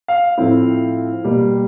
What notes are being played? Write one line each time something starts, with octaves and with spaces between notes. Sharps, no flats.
F5
A2 F3 A3 C4 E4
B2 G3 A#3